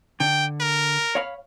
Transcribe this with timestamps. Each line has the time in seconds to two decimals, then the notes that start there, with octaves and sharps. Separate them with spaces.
0.20 D3 G5
0.61 A#4
1.15 C#5 F5 B5